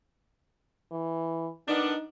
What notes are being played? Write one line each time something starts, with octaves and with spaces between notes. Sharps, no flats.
E3
D#3 B3 D4 D#4